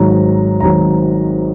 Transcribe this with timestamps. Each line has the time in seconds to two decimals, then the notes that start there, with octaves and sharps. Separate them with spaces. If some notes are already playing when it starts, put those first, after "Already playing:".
Already playing: G#1 G#2 F#3 A#5
0.60 G#1 F#3 A#5